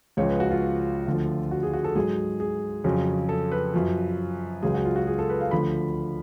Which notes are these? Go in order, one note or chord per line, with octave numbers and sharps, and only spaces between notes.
C#2 C#3 F3 C#5
B4
F#4
F4
D2 D3 F3
F#4
G#4
F#4
A4
G#2 F#3 G#4
G#4
F2 C#3 F#3
A4
B4
F#2 F3
C#2 C#3 F#3 G#4
F#4
F4
F#4
G#4
A4
B4
F5
D2 D3 F3 B5